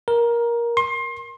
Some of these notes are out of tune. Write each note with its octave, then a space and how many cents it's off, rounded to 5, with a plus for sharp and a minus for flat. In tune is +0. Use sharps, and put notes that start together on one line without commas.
A#4 +15
C6 +30